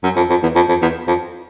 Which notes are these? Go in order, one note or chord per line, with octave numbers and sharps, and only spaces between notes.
F#2
F2
F2
E2
F2
F2
E2
F2